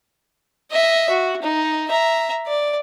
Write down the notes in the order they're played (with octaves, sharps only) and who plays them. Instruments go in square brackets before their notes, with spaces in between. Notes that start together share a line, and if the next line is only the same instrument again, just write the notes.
[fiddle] D#5 E5
F#4
D#4
E5 A#5
D5